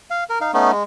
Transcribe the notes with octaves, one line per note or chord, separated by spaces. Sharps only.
F5
A#4
D#4 F5
A3 B3 C#4 D#4
G#3